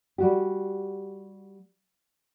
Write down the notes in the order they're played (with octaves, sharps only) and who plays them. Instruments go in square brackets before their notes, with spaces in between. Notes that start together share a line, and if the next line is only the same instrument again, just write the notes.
[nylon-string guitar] G3 F#4 G4